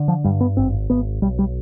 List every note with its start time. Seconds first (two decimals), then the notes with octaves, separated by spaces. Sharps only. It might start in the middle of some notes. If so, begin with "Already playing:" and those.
Already playing: D3
0.08 F3
0.24 G2 G3
0.41 B3
0.57 G#1 C4
0.90 G#1 B3
1.22 B1 G3
1.39 G3